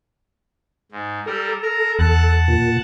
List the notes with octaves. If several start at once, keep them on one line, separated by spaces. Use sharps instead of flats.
G#2
G3 A4 A#4
A#4 A#5
E2 F#5 A5 F#6
A#2